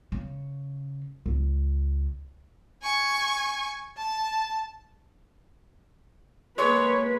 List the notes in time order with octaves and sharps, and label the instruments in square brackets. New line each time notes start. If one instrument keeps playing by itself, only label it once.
[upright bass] C#3
C#2
[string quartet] G#5 C#6
A5
[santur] G#3 [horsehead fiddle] A#3 B4 [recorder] C#5